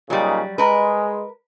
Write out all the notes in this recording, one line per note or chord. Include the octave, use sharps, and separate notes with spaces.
A#2 C#3 F#3 G3 D#4
G#3 A#4 B4